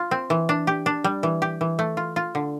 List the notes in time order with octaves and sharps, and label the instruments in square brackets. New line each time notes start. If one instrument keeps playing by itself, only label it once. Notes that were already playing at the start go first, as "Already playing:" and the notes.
Already playing: [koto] F4
C4
E3
D4
G4
D4
G3
E3
G4
E3
A3
F4
F4
D3